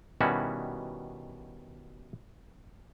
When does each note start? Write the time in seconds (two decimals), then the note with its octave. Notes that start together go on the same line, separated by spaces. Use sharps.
0.21 B2 D#3 G3 C#4 E4 F#4